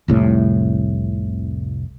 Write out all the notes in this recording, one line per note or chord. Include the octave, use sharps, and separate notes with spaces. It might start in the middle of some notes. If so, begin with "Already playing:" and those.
F1 C2 A2